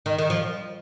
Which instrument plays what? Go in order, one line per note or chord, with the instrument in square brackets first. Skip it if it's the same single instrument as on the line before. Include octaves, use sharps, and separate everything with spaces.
[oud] D#3
D#3
F3